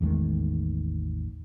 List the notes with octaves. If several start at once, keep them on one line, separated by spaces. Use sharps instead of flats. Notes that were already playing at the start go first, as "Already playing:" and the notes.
A1 E2 D#3 G#3